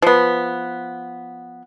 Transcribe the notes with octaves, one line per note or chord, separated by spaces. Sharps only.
F3 B3